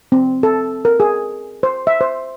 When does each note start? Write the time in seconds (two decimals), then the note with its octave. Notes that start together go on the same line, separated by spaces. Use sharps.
0.12 C4
0.43 A4
0.85 A#4
1.00 G#4
1.63 C5
1.87 E5
2.01 C5